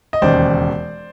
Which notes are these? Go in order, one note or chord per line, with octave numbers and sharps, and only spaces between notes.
D#5
E1 D#2 C#3 C5 D5